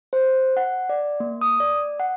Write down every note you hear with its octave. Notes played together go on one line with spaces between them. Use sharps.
C5
F#5
D5
A#3
D#6
D5
F#5